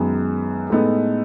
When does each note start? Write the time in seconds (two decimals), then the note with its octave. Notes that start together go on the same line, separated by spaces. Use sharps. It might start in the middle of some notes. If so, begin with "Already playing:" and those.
Already playing: F#2 D#3 G#3 B3
0.70 A2 G#3 B3 D#4 A4